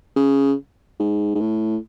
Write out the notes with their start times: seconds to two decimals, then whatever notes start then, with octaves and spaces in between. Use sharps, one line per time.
0.16 C#3
1.00 G#2
1.35 G#2
1.41 A2